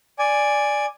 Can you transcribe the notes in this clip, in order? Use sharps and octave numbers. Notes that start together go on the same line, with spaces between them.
D5 G#5